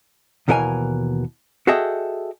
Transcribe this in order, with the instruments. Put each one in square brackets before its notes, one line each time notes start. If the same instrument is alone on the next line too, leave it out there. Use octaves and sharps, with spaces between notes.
[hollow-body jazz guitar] D#2 B2 E3 A#4 C#5 G#5
F#4 G#4 A4 D#5 E5 G5